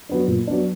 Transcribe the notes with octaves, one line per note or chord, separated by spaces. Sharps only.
F#3 B3 D4
A#2
F#3 B3 D4